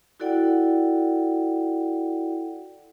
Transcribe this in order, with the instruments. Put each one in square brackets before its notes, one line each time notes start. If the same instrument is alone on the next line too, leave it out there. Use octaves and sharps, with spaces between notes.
[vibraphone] E4 F#4 A4 D5 F#5 G5